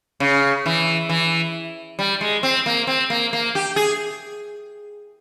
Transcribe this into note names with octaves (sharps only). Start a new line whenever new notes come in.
C#3
E3
E3
G3
G#3
C4
A#3
C4
A#3
A#3
G4
G#4